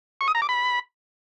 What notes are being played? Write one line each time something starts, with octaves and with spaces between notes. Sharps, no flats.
C#6
D#6
A#5
D6
B5